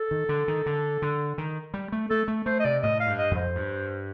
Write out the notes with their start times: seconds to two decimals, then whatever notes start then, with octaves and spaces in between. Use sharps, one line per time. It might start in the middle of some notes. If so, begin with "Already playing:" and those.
Already playing: A4
0.11 D#3
0.29 D3
0.48 D#3
0.66 D3
1.02 D3
1.38 D#3
1.74 G3
1.92 A3
2.10 A3 A4
2.28 A3
2.46 A3 C5
2.60 D#5
2.65 C3 D5
2.83 A2 D#5
3.00 F5
3.07 G2
3.18 D#5
3.31 F2
3.37 C5
3.55 G2